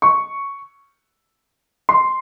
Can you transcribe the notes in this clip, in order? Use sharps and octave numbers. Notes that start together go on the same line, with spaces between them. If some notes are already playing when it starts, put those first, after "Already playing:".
C#6
C6